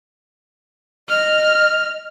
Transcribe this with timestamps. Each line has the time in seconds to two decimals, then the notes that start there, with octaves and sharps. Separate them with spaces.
1.09 D#5 F6